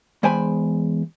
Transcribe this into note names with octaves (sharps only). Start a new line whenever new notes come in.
E2 G#3 C5 G5 G#5 B5